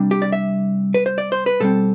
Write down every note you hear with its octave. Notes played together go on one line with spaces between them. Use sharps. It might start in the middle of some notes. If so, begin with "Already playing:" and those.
Already playing: C3 G3 D4
G4
D5
E5
B4
C5
D5
C5
B4
B2 G3 C4 A4